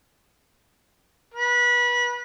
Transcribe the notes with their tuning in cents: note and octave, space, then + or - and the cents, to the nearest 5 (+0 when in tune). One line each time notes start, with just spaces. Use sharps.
B4 -25